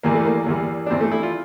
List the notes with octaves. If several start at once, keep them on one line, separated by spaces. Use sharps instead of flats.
E2 E3 G3 A#3
A3
A#3
E2 E3 G3
D4
E2 E3 G3 C4
A3
E4
F4